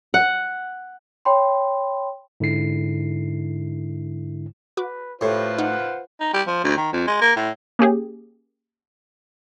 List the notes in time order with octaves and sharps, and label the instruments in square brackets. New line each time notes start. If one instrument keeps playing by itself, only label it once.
[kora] F#5
[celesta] C#5 G5 B5 C6
[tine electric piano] G#2 D3 E4 C7
[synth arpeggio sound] F#4 D6 [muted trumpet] B4
[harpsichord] A2 [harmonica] F4 B4 C5 [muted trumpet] G4
[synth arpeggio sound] D#4 [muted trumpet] F#5
[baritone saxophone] D#4
G3
F3
D2
D#3
F2
G#3
A#3
A2
[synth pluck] A#3 C#4 G4 G#4